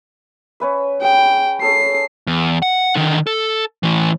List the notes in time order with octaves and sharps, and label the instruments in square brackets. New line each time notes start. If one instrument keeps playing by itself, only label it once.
[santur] C#4 B4 E5
[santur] G#4 [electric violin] G5
[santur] C#4 G#4 A4 [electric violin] C7
[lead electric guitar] E2
F#5
D3 D#3
A4
A2 E3